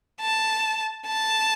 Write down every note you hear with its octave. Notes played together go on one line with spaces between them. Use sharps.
A5
A5